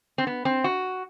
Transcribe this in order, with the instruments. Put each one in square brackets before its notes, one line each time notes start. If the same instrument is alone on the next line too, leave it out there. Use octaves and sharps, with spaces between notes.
[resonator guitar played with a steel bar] C4
B3
C4
F#4